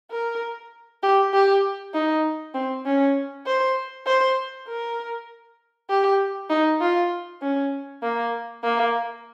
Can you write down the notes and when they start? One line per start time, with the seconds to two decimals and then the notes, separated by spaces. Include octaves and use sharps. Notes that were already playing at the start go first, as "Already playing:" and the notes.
0.11 A#4
1.03 G4
1.33 G4
1.94 D#4
2.55 C4
2.86 C#4
3.46 C5
4.06 C5
4.68 A#4
5.90 G4
6.50 D#4
6.81 F4
7.41 C#4
8.02 A#3
8.63 A#3